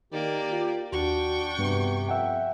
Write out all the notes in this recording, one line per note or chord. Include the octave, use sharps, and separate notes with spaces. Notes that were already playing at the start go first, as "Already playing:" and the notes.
D#3 A#3 G4 D5
F4
D#2 D4 F#4 G5 C#6
G2 C3 B3
F2 E5 F#5 G5